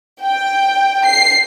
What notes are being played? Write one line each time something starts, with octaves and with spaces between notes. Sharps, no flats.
G5
C7